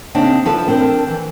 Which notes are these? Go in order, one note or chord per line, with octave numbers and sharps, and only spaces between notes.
C#3 A#3 C4 D4 D#4
F3 E4 A4 B4 E5 A5
C4 D4 A#4 C5
E3